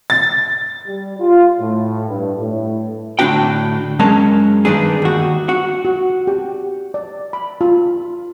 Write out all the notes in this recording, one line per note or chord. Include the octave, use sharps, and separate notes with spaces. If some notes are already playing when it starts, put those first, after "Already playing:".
A6
G3
F4
A2
G2
A2
A2 D3 C#4 D4 F#4 G5
F#2 G#3 C#4 A#4 C#5 A5
G2 D#3 B3 D4 G#4
D#2 F#4
F#4
F#4
G4
D5
B5
F4